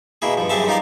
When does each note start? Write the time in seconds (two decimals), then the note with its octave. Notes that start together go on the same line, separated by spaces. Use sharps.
0.22 B2 A#3 E4 G#4
0.37 G2 F3
0.49 F#2 G3 C4 G#4 E5 A5
0.68 D#4 F4 G4 A#4 D5